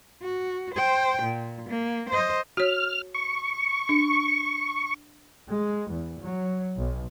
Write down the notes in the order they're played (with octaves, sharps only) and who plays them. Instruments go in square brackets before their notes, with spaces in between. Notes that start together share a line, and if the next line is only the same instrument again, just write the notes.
[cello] F#4
C5 G5
A#2
A#3
C5 D#5
[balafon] F#4 C#5 [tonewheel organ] F6
[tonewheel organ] C#6
[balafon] D4
[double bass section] G#3
E2
F#3
B1